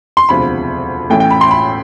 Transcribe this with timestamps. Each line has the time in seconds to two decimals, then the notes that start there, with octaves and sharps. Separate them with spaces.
0.17 C6
0.29 E1 D2 C3 F3 B5
1.10 A1 A2 E3 A3 G5
1.20 G5
1.31 B5
1.41 C6
1.51 B5